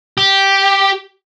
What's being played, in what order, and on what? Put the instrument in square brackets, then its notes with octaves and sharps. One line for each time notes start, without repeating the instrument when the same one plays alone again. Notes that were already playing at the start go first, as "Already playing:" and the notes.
[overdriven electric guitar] G4